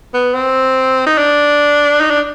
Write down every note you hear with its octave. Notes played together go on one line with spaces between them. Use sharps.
B3
C4
D#4
D4
D#4
D4